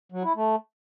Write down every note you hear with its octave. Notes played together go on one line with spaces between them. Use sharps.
F#3
E4
A3